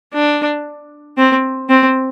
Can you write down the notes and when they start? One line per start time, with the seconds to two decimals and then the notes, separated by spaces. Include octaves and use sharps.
0.13 D4
1.17 C4
1.69 C4